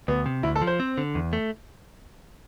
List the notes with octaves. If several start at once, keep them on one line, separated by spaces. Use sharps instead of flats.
D2 B3
C3
D2 E4
A4
F3
C5
C4
D3
E2
A3